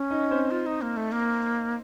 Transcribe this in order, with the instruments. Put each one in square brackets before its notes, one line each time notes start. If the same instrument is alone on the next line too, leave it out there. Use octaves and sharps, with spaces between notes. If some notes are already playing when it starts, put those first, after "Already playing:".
Already playing: [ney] C#4
[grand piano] D#4 D#5
C4 C5
[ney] F4
D#4
A#3
A3
A#3